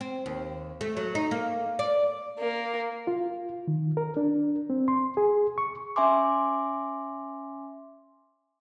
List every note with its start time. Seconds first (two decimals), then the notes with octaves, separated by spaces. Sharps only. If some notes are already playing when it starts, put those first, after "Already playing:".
0.01 C4
0.26 D#2
0.81 A3
0.97 F#3
1.15 D#4
1.31 A#3
1.79 D5
2.38 A#3
3.07 F4
3.68 D#3
3.97 A#4
4.17 D4
4.70 C4
4.88 C6
5.17 G#4
5.58 C#6
5.96 C#4 E5 G#5 C6 D6